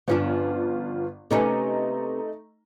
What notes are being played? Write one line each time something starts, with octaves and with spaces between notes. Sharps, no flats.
G1 F3 B3 C#4 D4 F4
C3 A3 B3 C#4 D#4 A#5